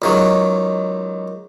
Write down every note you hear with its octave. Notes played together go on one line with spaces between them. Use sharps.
C#2 D#3 F#3